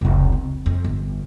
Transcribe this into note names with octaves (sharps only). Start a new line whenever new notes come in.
F1 C#2
C4
F2
G1